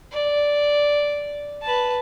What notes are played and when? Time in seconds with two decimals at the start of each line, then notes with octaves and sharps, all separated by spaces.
0.12 D5
1.62 B4 A5